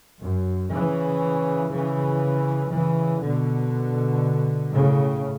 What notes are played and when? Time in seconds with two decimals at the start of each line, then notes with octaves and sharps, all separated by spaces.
0.20 F#2
0.71 C#3 E3
1.71 C#3 E3
2.72 C#3 E3
3.22 B2 D3
4.72 A2 C#3